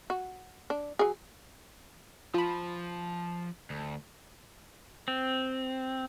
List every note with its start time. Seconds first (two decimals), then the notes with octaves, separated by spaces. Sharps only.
0.10 F#4
0.70 D4
0.99 F#3 G#4
2.34 F3 F4 B5
3.70 D2
5.08 C4